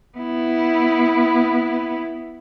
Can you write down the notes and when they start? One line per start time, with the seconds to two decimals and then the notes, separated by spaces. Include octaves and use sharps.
0.18 B3 E4